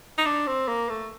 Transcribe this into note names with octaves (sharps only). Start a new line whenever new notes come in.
D#4
D4
C4
A#3
A3